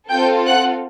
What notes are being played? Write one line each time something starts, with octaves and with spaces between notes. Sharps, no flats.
C4 F4 A4 G5 G6
F#5 F#6